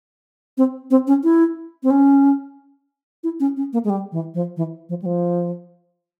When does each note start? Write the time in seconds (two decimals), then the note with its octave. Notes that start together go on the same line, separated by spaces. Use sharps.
0.58 C4
0.90 C4
1.07 C#4
1.24 E4
1.83 C4
1.91 C#4
3.24 E4
3.40 C#4
3.57 C#4
3.73 A#3
3.85 G#3
3.90 G3
4.12 E3
4.34 F3
4.57 E3
4.89 F3
5.02 G3
5.06 F3